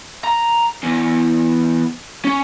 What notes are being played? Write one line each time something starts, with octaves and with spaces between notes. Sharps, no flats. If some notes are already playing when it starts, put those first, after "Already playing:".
A#5
E2
C#4